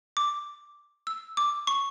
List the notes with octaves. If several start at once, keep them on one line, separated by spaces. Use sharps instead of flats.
D6
E6
D6
C#6